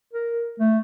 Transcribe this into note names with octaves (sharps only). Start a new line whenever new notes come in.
A#4
A3